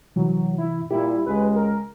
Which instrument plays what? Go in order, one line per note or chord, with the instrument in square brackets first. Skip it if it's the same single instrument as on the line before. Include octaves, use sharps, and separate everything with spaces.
[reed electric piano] C3 E3 [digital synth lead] F#3
[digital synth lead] E4
[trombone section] A#2 G3 [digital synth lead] E4 [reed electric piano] G4
[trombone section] C#2 G#3 [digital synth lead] B4
[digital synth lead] A#4